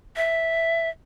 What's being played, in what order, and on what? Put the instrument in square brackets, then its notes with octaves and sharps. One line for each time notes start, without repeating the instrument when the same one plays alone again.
[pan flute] E5